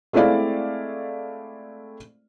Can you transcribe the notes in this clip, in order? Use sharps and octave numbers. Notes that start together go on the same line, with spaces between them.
G#3 A3 C4 E4 D5 F5